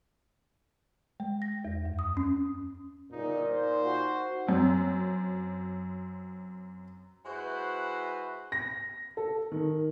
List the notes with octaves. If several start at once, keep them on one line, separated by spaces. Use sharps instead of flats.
G#3
A#6
E2
F#2
D#6
C#4
G1 A#2 C#3 D#4
D#4 C5
F#4
F#2 C4
G#3 E4 F#4 B4 C5
A#6
A4
D#3